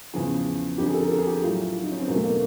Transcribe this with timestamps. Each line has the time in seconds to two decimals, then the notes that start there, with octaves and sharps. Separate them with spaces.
0.14 E2 C#3 F3 G#4
0.78 F2 D3 F3 G4
0.86 G#4
0.94 A4
1.03 A#4
1.11 A4
1.19 G#4
1.27 G4
1.43 A2 F#3 F4
1.75 E4
1.83 D#4
1.92 C#4
2.00 C4
2.08 E2 B2 F#3 A#3
2.16 A3
2.24 A#3